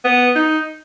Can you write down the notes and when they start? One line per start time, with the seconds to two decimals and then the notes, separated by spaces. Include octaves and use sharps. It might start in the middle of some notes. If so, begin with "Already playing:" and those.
0.05 B3
0.35 D#4